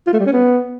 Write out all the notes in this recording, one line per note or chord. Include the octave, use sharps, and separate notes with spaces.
F4
A3
G3
C#4
B3